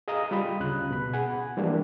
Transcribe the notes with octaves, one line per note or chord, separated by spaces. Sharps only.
G#4 D#5 F5 A#5 D#6
G3 F4 B5 D#6
D2 C#3 F#6
B2 B5
G#4 F#5 G#5
E3 F3 G3 G#3 A#3 D4